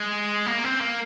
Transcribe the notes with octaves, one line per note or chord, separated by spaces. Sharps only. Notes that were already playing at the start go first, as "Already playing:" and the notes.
Already playing: G#3
A#3
C4
A#3